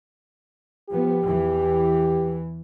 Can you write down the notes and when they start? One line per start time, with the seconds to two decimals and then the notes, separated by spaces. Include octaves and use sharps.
0.90 F3 B3 G4
1.25 E2 E3